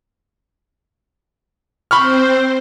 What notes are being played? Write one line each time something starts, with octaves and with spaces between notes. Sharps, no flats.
C4 C5 B5 C#6 F6